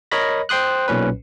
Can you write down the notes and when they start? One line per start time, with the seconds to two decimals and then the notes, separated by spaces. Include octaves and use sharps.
0.11 A#4 C#5 D#5 B5 A#6
0.49 C5 G5 C6 D#6 F#6
0.88 B1 A#2 C#4 B4